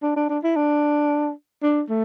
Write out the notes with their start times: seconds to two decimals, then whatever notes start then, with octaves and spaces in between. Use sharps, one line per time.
0.03 D4
0.16 D4
0.29 D4
0.44 E4
0.56 D4
1.63 D4
1.89 A3